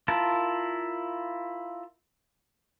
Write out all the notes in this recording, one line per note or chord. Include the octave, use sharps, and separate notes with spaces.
E4 F4 A#4 A5